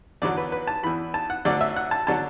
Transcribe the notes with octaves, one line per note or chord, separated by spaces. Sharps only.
E2 D3 F#3 D5
B4
B4
A5
E2 E3 B5
A5
F#5
D2 D3 F#3 D5
E5
F#5
A5
D3 F#3 A5